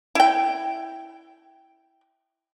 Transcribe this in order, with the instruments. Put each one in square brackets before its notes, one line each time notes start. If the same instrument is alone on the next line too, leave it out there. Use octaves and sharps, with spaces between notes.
[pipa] E4 G5